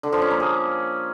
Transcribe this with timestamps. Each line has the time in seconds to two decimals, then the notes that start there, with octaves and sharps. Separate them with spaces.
0.03 D3
0.12 F3
0.22 C#4
0.31 A#3
0.40 G#4